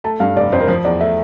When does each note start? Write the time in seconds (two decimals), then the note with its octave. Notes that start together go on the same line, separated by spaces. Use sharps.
0.04 A3 A5
0.20 G2 F5
0.36 F1 D5
0.52 F2 C5
0.60 A#4
0.68 F3 C5
0.85 E2 D5
1.01 A3 E5